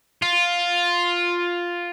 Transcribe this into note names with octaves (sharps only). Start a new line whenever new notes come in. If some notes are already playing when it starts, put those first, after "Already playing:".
F4